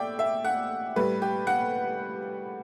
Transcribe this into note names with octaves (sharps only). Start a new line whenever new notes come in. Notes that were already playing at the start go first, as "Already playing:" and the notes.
Already playing: A2 D5 E5 G5
E5
F#5
A2 G3 B4
G4
F#5